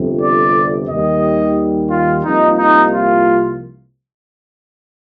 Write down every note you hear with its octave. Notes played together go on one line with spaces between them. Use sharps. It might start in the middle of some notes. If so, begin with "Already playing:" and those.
Already playing: G1 F2 C3
D5
D#2 D#3 G3 D#5
F4
C2 C3 F3 A#3 D#4
D#4
F4